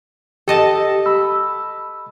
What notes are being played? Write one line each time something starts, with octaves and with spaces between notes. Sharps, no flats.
G4 A4 D#5 A5
B5 E6